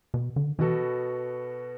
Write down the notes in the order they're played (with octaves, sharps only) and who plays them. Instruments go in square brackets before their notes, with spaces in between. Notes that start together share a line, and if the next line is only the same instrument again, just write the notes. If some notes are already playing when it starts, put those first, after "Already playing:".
[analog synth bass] B2
D3
[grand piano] B2 B3 F#4 A4 [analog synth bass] E3